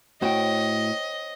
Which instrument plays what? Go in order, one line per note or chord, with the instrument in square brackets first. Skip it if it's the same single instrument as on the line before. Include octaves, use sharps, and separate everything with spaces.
[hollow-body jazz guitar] A2 F#4 [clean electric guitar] C5 C#5 G5 [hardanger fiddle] D#5